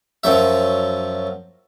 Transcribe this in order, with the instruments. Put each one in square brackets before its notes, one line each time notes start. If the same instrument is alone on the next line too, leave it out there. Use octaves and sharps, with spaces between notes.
[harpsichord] F#2 F3 F#3 E5